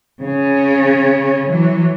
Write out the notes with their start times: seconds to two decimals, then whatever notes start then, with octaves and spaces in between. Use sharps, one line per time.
0.22 C#3 C#4
1.48 E3 F#3